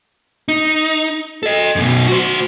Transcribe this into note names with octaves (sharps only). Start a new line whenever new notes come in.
D#4
A4 D#5
F#2 B2
F#4 C5